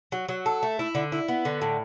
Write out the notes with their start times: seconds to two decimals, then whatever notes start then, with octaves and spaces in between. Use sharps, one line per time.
0.12 F#3
0.29 F#3
0.46 A4
0.63 A3
0.79 E4
0.95 D3
1.12 E4
1.28 B3
1.45 D3
1.62 A2